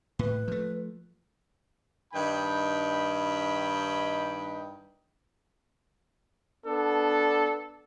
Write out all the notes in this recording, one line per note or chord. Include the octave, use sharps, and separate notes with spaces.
A2 B4
F3 A3
G2 D#3 D#4 G5 B5
B3 D4 A4